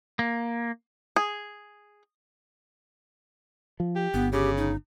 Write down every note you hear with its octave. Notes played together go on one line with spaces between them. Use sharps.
A#3
G#4
F3
G4
G1 B3
C#3 G4
D#4